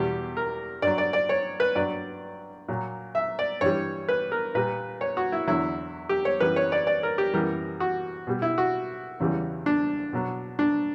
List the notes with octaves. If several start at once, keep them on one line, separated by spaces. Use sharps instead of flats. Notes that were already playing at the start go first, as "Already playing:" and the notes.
Already playing: E2 B2 G3 G4
A#4
G2 F#3 D5
D5
D5
C#5
B4
G2 F#3 D5
A#2 F#3
E5
D5
G2 E3 G3 C#5
B4
A#4
A#2 G3 B4
C#5
F#4
E4
E2 D3 F#3 E4
G4
C#5
F#2 E3 G3 B4
C#5
D5
D5
A#4
G4
F#2 E3 G3 A#4
F#4
B2 G3
E4
F#4
E2 C#3 E3 G3
D4
B2 F#3
D4